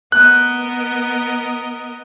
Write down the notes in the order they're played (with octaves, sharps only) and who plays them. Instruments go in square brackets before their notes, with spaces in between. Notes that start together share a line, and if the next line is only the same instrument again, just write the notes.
[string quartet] B3 A#4 D#5 [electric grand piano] F#6